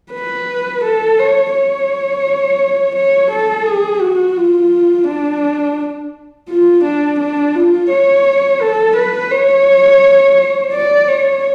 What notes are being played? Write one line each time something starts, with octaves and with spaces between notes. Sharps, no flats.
B4
A4
C#5
C#5
C#5
A4
G#4
F#4
F4
D4
F4
D4
D4
F4
C#5
A4
B4
C#5
D5
C#5